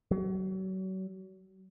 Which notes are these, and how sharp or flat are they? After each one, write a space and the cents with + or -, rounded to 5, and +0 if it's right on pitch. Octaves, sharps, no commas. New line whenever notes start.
F#3 +35